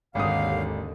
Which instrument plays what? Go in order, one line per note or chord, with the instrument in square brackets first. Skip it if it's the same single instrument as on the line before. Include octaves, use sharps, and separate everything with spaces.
[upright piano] G#1 D#6 [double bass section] D#2 D3 [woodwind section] F#3 G4 F5